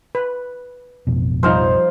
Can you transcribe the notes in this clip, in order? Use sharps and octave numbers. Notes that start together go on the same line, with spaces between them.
B4
A1 F2 B2
F3 G3 D#4 C5 F5